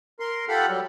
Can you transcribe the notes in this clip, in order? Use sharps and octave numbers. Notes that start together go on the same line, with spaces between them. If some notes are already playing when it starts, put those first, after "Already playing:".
A#4 C6
F4 G4 A4 F#5 B5
F#3 G3